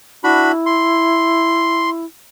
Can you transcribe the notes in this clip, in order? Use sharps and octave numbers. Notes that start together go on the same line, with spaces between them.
D4 E4 F#4 B5
C6